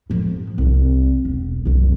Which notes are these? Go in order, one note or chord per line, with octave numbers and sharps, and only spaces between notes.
A2 F3
C2
E1
C2 F#2